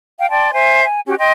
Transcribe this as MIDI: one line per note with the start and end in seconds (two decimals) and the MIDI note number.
0.18 0.29 77
0.18 0.29 79
0.30 0.50 74
0.30 0.50 79
0.30 0.50 81
0.30 0.50 84
0.52 0.85 72
0.52 0.85 76
0.52 0.85 80
0.85 1.01 80
1.06 1.15 61
1.06 1.15 66
1.06 1.15 67
1.19 1.32 75
1.19 1.32 79
1.19 1.32 84